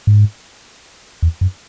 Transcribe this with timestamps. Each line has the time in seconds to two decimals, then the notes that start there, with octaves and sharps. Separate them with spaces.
0.07 G#2
1.23 E2
1.41 F#2